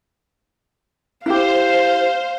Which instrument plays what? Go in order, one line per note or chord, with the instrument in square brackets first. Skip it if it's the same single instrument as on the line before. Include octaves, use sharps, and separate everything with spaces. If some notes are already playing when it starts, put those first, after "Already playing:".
[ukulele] E4 G4 [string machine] C5 [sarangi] F5